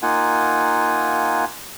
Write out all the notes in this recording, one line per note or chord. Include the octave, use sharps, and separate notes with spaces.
A#3 D#4 F4 F#5 G#5